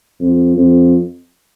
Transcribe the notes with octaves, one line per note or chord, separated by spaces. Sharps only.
F2
F2